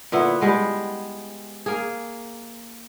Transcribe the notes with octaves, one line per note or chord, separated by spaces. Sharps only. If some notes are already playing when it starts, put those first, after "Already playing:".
A#2 D3 B3 E4
G3 G#3 B3
A#3 G#4